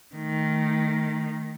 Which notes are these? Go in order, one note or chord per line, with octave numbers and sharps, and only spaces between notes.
D#3 A3